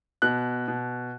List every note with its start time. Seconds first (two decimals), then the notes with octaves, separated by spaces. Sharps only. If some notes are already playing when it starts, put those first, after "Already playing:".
0.22 B2 F#6
0.68 B2